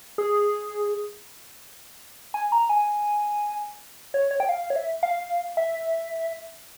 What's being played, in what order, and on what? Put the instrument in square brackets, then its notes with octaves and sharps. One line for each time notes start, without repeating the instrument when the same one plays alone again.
[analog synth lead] G#4
G#5
A#5
G#5
C#5
C#5
G5
F5
C#5
E5
F5
E5